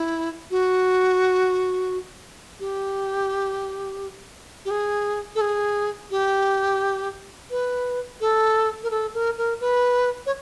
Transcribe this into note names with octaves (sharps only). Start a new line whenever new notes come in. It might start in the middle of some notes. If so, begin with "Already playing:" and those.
Already playing: E4
F#4
G4
G4
G#4
A4
G#4
G4
B4
A4
A#4
A4
A#4
A#4
B4
C#5